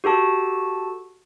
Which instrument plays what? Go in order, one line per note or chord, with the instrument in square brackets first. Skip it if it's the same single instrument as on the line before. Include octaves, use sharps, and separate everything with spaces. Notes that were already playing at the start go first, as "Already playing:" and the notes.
[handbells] F#4 G4 A4 A5